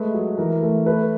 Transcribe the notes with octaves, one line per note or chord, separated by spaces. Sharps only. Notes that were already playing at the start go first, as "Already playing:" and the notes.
Already playing: G#3 A3 B4
F#3
E3 A#4
A3
A3 B4